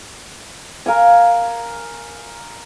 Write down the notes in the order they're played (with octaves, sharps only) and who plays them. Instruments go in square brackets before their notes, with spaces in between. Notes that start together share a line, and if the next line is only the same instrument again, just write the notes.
[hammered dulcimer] A#4 F5 G#5